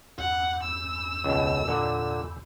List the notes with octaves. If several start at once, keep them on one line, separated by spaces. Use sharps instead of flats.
E2 G2 F#5
E6
C#2 B2
A#2 D3